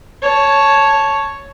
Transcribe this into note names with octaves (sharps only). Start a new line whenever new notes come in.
C#5 A5